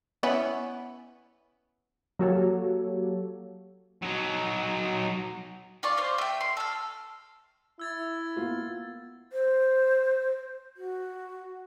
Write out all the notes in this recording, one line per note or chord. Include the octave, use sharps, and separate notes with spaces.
B3 C#4 E4
F#3 A#3 F#4 G4 A4 C#5
F#3 D#4
F4 D5 C#6
C5 F5
A3 G5
C6
A4 F6
E4 E6 G#6 A6
A#3 B3 F4
C5
F#4